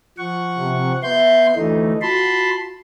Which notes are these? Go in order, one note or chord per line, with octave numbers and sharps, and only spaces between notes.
F3 F#5 C#6
C3
B3 E5 C6 G6
D2 E3 A3 D#4
F4 F#4 A5 B5 C6